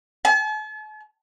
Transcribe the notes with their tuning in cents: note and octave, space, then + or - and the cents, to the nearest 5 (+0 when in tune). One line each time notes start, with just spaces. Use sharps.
A5 -45